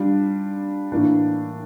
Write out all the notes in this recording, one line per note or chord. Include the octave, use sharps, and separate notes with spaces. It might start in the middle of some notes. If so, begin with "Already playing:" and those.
Already playing: G3 D4 F4
A2 E3 A#3 D4